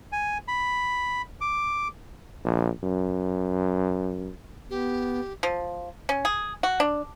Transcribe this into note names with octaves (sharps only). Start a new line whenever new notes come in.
G#5
B5
D6
A#1
F#2
B3 G4
F3
C#4
G#4
F#4
D4